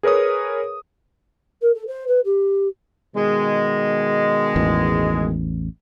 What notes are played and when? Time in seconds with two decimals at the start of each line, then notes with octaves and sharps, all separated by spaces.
0.03 G#4 A#4 B4 C#5 D#6
1.61 A#4
1.74 A4
1.87 C5
2.07 B4
2.24 G4
3.15 B2 D#3 G#3
4.56 A1 E2